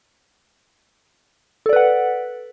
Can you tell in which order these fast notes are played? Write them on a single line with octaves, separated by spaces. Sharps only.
A4 D5 B4 F#5